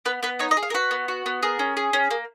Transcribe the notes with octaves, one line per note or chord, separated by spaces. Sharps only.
B3 B4
B3 B4
D#4 C#5
D#5
G#4
F5
A#4
F#4 B4
B3
F#4
B3
G#4 A#4
C#4
G#4
C#4
A#3